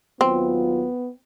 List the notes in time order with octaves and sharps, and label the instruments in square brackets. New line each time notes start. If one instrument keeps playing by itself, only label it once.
[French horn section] D#2 F#3 F4 [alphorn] B3 [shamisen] C4